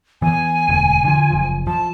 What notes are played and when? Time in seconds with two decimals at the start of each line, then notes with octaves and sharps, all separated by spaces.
0.22 E3 B3 G#5
0.69 E1 D2
1.04 D3 F3
1.30 F#1 F3
1.67 F3 A5